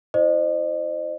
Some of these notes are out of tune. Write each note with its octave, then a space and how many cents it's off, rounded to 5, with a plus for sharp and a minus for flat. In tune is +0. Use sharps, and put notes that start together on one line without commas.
E4 +0 C5 +0 D#5 -40